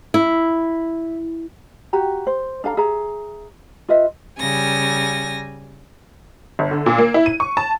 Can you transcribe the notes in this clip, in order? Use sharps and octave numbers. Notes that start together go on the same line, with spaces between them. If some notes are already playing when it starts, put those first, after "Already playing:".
E4
F#4 G4 A#5
C5
D4 A4 F5 A#5
G#4 E5 A#5
F4 B4 D#5 E5
C#3 G3 G#5 A#6
G1
D3
A#2
A#3
E4
D#7
C#6
A5